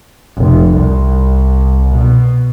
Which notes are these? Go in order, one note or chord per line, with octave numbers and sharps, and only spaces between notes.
F1
C2
B2